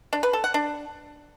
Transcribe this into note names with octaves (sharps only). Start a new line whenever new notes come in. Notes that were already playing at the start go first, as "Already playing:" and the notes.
D4
B4
A4
F#5
D4